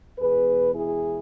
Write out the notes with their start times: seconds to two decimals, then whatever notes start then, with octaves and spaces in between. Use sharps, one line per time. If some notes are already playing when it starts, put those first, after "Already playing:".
0.19 E2 B2 G#3 G#4 B4
0.75 E4 G#4